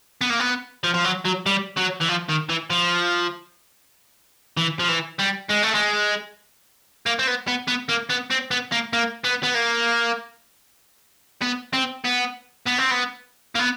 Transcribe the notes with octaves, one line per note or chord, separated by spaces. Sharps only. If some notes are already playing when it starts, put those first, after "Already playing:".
B3
A#3
B3
F3
F3
F#3
F#3
G3
F#3
E3
F3
D#3
E3
F3
E3
F3
E3
G3
G#3
A3
G#3
A#3
C4
B3
B3
B3
A#3
B3
C4
B3
A#3
A#3
B3
B3
A#3
B3
C4
B3
B3
C4
B3
A#3
B3